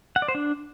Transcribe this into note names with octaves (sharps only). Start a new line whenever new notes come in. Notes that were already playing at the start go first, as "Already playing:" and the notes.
F#5
D5
C5
D4